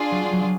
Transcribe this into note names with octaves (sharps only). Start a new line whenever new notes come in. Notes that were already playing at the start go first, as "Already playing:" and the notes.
Already playing: D4 F4 G#4
F#3
G3
F#3
F#3